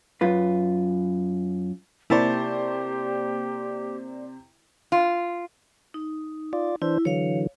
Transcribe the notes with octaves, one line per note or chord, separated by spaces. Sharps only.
F#2 F4 B4
C3 A#3 E4 G4 C5 D5 A5 C#6
F4
D#4
F4 D5
E3 D4 E4 C5
D3 E3 F#3 C#5 F5